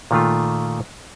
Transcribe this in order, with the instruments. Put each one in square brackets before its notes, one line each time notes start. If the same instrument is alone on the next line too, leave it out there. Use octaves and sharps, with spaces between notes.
[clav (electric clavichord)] A#2 D#3 A3 F4